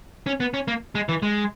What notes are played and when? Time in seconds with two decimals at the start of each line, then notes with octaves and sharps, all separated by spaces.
0.26 C#4
0.40 B3
0.54 C#4
0.68 A#3
0.95 G#3
1.09 E3
1.22 G#3